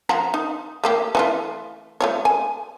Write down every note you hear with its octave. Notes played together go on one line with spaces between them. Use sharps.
F3 F#5 A#5
D#4
A3 A#3 G4
E3 A3 F4
A3 F4 C#5
G#5